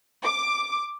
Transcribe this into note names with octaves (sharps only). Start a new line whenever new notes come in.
D6